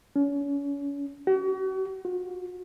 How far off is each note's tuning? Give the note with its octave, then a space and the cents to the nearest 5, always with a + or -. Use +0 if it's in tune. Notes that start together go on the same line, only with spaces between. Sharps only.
C#4 +35
F#4 +40
F#4 -40